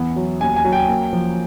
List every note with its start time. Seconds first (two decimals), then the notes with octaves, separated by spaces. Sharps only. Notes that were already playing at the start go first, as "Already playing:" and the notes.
Already playing: E2 E3 B3
0.16 F#3
0.41 D#2 G#5
0.56 G#5
0.65 F#3
0.73 G5
0.89 A#3
1.13 F3